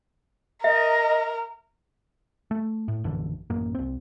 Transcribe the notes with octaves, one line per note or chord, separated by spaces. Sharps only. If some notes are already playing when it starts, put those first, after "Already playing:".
A#4 D#5 E5
A3
A2
A#1 F#2 D3 E3
A1 F#2 A#3
C2 C4